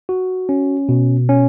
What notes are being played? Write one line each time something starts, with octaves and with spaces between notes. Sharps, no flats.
F#4
C#4
B2
C#4